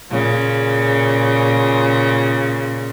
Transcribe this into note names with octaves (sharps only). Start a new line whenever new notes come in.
A#2 C#3